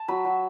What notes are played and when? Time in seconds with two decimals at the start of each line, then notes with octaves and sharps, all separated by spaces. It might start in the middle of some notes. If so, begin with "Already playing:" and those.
Already playing: A5
0.08 F#3 B5
0.25 F#3